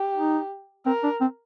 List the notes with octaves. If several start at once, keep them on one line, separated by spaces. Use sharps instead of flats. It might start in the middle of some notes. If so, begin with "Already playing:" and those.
Already playing: G4
D#4
C4 A#4
D4
C4